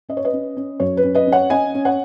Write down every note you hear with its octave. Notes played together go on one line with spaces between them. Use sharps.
C#4 D#5
C#5
B4 D#5
C#4
C#4
F#2 C#5
B4
C#4
B4 D#5
C#4
C#5 F#5
C#4 D#5 G#5
C#4
C#5 F#5